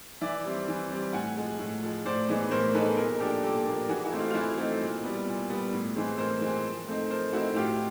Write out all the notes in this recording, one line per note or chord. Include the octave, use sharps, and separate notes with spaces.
E3 D5 E5
G3 C4
E3
G3 C4
A2 F#5 G#5
F3 G#3
A2
F3 G#3
A2 C5 D5
E3 G#3 B3 D#4
A2 A#4 C5
E3 G#3 B3 D#4 A4 B4
A#2 G#4 A#4
F3 A#3 D4 G4 A4
A#2 G4 A4
F3 A#3 D4
E3 F#4 G#4
E4 F#4
A3 C4 D#4
F4
F4
E3 E4 F#4
A3 C4 D#4
A#2
G3 B3
A#2
G3 B3
A2
E3 G#3 C4
A2 A#4 C5
E3 G#3 C4
F3
A3 C4 D#4
F3 A#4 C5
A3 C4 D#4 E4 F#4
A2 F4 G4